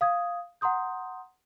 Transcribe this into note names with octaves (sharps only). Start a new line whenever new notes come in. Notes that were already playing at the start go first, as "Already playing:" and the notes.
F5 D#6 G#6
F#5 A#5 C6 D#6 G6